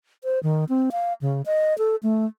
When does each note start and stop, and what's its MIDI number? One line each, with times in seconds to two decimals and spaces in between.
0.24 0.39 72
0.43 0.65 51
0.69 0.90 60
0.92 1.13 77
1.21 1.42 49
1.46 1.76 75
1.78 1.96 69
2.03 2.26 57